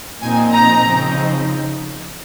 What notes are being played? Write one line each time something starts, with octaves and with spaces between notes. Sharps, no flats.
A#2 F3 C4 D#4 G#5
A#5
C#3 F3 C4 D#4